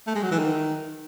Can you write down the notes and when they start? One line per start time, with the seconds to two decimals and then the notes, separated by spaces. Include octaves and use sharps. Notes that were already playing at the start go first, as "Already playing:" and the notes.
0.07 A3
0.15 G#3
0.23 F#3
0.31 E3
0.39 D#3